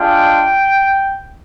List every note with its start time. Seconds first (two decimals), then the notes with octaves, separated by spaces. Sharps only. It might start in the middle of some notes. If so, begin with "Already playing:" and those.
Already playing: G#3 D4 F4 G5